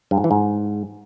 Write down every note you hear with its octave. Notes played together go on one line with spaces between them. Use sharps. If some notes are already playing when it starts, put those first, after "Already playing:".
G2
G#2
E3
G#2